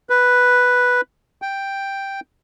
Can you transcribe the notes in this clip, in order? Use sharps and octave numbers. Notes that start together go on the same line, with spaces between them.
B4
G5